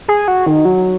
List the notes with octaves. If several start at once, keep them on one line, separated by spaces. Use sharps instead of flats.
G#4
F#4
D#3
F#3